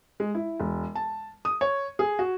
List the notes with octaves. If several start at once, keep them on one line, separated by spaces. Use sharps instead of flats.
G#3
E4
E1
A5
D#6
C#5
G#4
F#4